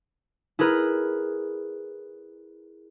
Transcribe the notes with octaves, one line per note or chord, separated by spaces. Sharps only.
E4 G#4 A#4 B4